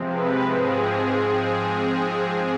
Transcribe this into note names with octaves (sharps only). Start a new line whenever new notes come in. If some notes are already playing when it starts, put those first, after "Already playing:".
Already playing: C3 F3 G#3 C4
B4
G#2 F3 G#3 C4 G#4